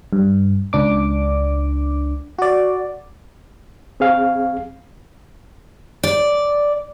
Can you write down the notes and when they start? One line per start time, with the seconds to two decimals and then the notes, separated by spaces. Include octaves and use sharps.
0.13 G2
0.73 C#2 D4 D6
2.39 F#4 D5
4.00 C4 G#4 F5
6.03 D5